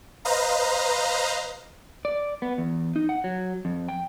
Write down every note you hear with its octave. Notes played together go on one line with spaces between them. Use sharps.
B4 C5 D#5 F5 A#5
D5
B3
E2
D#4
F#5
F#3
F2
G5